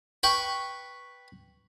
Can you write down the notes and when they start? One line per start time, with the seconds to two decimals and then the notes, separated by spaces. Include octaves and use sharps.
0.23 B4 G5 C#6